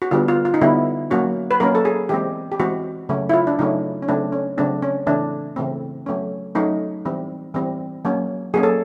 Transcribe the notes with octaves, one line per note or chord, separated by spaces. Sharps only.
F#4
D3 G3 B3 F4
F4
F4
D#4
D3 G3 B3 E4
F#3 A#3 C#4 F#4
B4
F#3 A#3 C#4 A#4
A4
G#4
E3 G#3 C4 G4
G4
E3 G#3 C4 F#4
C#3 F#3 A3 C#4
E4
F4
D4
C#3 F#3 A3 C#4 D#4
C#4
C#3 F#3 A3 C4 D4
C#4
C#3 F#3 A3 C4 D4
C#4
C#3 E3 A3 C4 D4
C#3 E3 A3 C4
F#3 A3 C#4
F#3 A3 C#4 D#4
E3 G3 C4
E3 G3 C4
F#3 A#3 C#4
F#3 A#3 C#4 G#4
A4